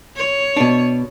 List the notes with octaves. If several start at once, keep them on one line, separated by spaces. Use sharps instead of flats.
C#5
B2 D4